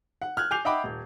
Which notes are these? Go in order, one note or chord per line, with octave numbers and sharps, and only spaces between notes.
F#5
F6 F#6 G#6
G#5 D6 G6 C7 F7
D#5 E5 F#5 G5 B5 D6
D#1